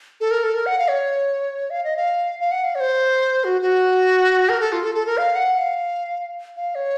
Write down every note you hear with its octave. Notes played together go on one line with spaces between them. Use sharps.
A4
A#4
A4
A#4
F#5
F5
C#5
F5
D#5
F5
F5
F#5
F5
C#5
C5
F#4
F#4
A#4
A4
F4
A4
A4
A#4
F5
F#5
F#5
F5
F5
C#5